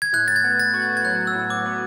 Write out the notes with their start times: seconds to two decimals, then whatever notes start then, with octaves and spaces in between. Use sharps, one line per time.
0.02 G#6
0.13 A2 F#6
0.28 A6
0.36 G#6
0.44 B3
0.59 A6
0.74 F#4
0.82 G#6
0.97 G#6
1.05 F#3 F#6
1.27 E6
1.35 A2
1.50 D6
1.66 B3